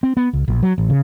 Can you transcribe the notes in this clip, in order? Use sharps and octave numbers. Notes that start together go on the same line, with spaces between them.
C4
B3
C#2
A#1
F#3
A1
C#3